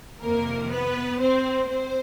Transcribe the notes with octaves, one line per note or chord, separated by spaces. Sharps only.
F2 C3 D#3 A#3 A#4
B3 B4
C4 C5
C4 C5